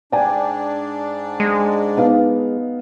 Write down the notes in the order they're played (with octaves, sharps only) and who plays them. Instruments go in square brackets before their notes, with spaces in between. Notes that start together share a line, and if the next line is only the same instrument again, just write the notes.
[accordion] G#2 D4 [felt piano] D5 G5 G#5
[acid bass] G#3
[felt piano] B3 D#4 F5